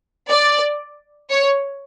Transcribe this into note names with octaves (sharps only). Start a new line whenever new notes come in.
D5
C#5